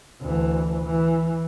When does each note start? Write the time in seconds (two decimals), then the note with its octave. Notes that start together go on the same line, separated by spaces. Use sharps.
0.21 D2 E3
0.84 E3